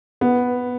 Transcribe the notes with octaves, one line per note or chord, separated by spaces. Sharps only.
B3